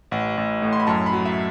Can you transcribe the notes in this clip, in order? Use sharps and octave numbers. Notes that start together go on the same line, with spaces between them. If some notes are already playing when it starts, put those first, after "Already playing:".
A1 F#5
A1
A2
C6
B5
F#2 A5
B5
F#3
E5